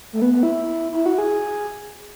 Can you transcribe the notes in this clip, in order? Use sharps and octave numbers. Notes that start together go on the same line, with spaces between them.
A3
B3
B3
E4
E4
F#4
G#4